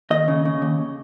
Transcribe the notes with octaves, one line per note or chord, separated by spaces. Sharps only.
D#2 D#5
C#3
C#3
D#2